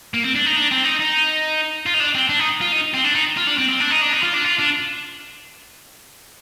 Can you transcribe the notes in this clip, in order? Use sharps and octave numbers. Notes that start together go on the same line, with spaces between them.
A#3
C4
D4
D#4
D4
C4
D#4
D#4
F4
D#4
D4
C4
D4
D#4
F4
D#4
C4
D4
D#4
F4
D4
C4
C4
D4
D#4
D4
D#4
F4
D4
F4
D4